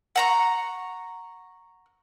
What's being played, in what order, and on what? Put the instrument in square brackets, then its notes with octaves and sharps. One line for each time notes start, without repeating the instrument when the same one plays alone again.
[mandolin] F#5 A#5 C#6